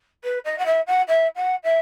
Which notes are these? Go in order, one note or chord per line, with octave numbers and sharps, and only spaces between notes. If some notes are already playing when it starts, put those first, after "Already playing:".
B4
D#5
F#5
E5
F#5
E5
F#5
E5